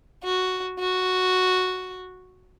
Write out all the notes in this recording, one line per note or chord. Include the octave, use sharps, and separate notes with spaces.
F#4
F#4